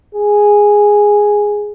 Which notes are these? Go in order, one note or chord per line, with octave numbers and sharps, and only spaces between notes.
G#4